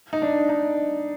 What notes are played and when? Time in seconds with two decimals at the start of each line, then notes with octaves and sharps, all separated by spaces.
0.13 D#4
0.22 D4
0.49 D#4